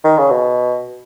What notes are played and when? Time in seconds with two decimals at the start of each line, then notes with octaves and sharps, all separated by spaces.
0.04 D#3
0.18 C#3
0.30 B2